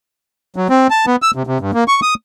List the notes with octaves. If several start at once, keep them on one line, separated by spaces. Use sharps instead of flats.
F#3
C4
A5
B3
E6
C3
C3
G2
A#3
C#6
D#6